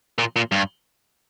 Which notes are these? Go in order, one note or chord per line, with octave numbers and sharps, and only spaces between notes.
A#2
A#2
G2